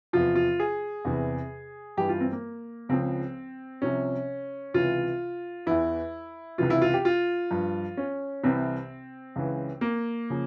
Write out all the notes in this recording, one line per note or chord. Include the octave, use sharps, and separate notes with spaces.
E2 C3 F3 F4
F4
G#4
E2 C3 E3
G2 E3 G4
F4
C4
A#3
C#2 C#3 F3 C4
C2 C3 F3 C#4
C#2 C3 E3 F4
E2 E3 E4
C#2 C3 E3 F4
E4
F4
G4
F4
G2 F3
C#4
C2 C3 E3 C4
C#2 C#3 E3
A#3
C#3 F3